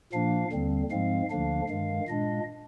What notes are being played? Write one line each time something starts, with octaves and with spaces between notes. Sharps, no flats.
A#2 F3 A#3 D4 F5
D#2 D3 G3 C4
G#2 F3 G#3 C4 F5
D2 D3 F3 A#3 D4 F5
G2 D#3 G#3 F5
A#2 G#3 D4 D#5